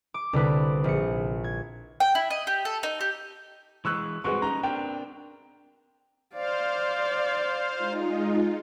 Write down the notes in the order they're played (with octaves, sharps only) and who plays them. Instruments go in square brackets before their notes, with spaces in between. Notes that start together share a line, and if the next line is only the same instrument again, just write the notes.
[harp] D6
C2 D3 E4 B4 D6
A#1 C#7
G#6
[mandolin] G5
E4
D#5
G4
A4
D#4
G4
[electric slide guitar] E3 G#3 [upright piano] C#6 E6 F#6
[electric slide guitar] G2 C4 F#4 [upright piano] G#3 B4 C#6
[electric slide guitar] C#4 D#4 G4 [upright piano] A#5
[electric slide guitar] C4 D4 A#4 [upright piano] G5
[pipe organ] C5 F5 [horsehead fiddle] D5
[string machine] G#3 D#4 F4